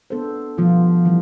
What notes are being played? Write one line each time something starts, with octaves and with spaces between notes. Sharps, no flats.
B3 D4 A4 C5
B2 F3 G3 B3 F4
E3 G3